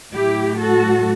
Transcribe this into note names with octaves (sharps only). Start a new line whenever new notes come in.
A2 F#3 A3 E4 G4
F#4 A4